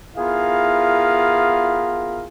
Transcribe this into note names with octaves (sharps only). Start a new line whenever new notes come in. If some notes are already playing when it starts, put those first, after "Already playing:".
B3 E4 F4 G#4 A#4 F5